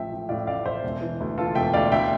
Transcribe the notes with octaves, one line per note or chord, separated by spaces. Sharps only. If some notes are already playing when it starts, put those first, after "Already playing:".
Already playing: A1 F3 E5 G5
A2
A2 D5 F5
A1 D5 F5
A1 C5 E5
E1
E3
D2
E3 F4 A4
E1 E5 G5
D2 D5 F5
D2 E5 G5